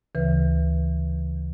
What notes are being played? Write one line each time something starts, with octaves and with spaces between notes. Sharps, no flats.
D2 C#3 E3 B4